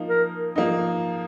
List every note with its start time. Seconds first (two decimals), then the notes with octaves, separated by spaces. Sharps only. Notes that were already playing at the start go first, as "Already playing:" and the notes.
Already playing: F3 A#3 D#4
0.09 A#4
0.56 F3 A#3 D#4